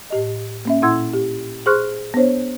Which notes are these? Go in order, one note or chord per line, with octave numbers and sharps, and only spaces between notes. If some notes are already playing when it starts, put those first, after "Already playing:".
A2 G4 D#5
A#3 C#4 E5
A#2 E4 F#5 C6 E6 G#6
G4
G#4 C5 C6 C#6 F6 F#6
B3 D4 C5 C#5